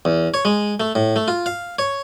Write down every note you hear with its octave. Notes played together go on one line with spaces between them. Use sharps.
E2
C#5
G#3
A3
A2
A3
F4
F5
C#5